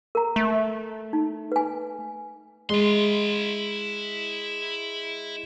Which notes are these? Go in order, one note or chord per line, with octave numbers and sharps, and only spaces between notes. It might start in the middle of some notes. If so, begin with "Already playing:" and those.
A#4 A#5
A3
D#4
B4 G#5
G#3 E4 C6